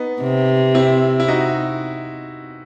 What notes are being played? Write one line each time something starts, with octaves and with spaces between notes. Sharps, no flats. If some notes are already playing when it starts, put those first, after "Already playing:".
Already playing: B3 D#4
C3
C4 E4
E4
D#4 F#4